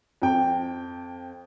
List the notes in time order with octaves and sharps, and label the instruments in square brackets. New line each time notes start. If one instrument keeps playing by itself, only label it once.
[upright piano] F2 G5